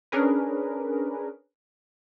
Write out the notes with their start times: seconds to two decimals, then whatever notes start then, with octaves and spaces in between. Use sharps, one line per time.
0.12 C#4 D4 G#4 A#4 B4